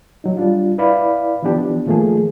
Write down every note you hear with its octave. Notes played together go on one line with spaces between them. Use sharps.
F#3 D#4
G3 D4 F4
E4 B4 D5 F5 B5
E3 F3 B3 D4 G4
D#3 F3 A3 A#3 G#4